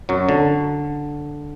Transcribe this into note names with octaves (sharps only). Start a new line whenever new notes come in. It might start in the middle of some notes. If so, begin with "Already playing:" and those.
F#2 F#3
D3